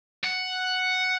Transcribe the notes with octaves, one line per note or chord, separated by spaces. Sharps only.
F#5